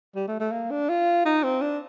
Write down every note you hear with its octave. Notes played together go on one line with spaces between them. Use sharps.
G3
A3
A3
A#3
D4
F4
D#4
C4
D4